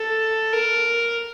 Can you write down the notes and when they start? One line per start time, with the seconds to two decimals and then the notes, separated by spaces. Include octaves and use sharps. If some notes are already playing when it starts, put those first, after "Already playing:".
Already playing: A4
0.53 A#4